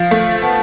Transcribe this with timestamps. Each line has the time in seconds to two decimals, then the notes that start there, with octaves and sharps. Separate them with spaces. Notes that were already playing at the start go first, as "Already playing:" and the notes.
Already playing: F3 F5
0.11 A3
0.42 B3 A5